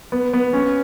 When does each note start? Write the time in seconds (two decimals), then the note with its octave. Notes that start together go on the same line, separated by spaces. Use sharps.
0.12 B3
0.33 B3
0.53 C#4